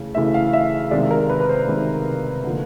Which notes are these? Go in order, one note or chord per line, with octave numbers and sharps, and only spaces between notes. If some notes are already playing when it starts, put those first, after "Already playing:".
Already playing: C#3 E3 A3
C#3 E3 A3 E5
F5
E5
C3 D#3 G#3 D5
A#4
B4
B4
C5
C3 D#3 G#3
D3 F3 A#3